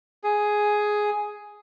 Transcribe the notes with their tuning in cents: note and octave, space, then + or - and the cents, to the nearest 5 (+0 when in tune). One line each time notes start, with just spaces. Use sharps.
G#4 +5